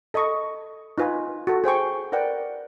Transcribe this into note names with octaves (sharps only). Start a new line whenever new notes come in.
A4 D#5 B5 C#6
D#4 F4 B4 G#5
F#4 A4
G#4 C5 G5 C#6
A#4 B4 D5 F#5 G5